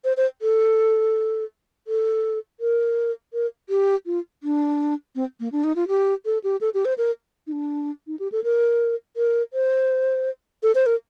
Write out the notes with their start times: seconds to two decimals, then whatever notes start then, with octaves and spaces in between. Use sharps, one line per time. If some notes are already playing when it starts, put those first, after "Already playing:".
0.04 C5
0.17 C5
0.42 A4
1.87 A4
2.60 A#4
3.33 A#4
3.69 G4
4.06 F4
4.43 D4
5.15 C4
5.40 A#3
5.52 D4
5.64 D#4
5.76 F4
5.88 G4
6.26 A4
6.44 G4
6.61 A4
6.74 G4
6.85 C5
6.98 A#4
7.47 D#4
7.52 D4
8.07 D#4
8.19 G4
8.32 A4
8.44 A#4
9.17 A#4
9.53 C5
10.63 A4
10.75 C5
10.86 A#4